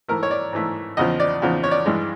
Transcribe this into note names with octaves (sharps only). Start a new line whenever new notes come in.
G#2 E3 A3 A#4
C#5
D5
G#2 E3 A3
E2 C#3 F3 D#5
D5
E2 C#3 F3
C#5
D5
G2 E3 G#3